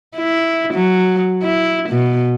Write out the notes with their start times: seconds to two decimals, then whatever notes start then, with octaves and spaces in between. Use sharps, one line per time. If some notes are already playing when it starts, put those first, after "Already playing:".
0.17 E4
0.74 F#3
1.43 E4
1.89 B2